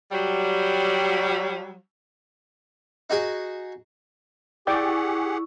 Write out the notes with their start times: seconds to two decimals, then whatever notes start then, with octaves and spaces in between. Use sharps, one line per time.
0.12 F#3 G3
3.10 D#4 F#4 G#4
4.67 E4 G4 G#4 D5 F#5 G5 C#6 D6